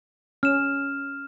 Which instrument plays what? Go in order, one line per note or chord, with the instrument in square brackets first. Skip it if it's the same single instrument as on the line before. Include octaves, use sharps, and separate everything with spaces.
[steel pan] C#4 [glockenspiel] F6 E7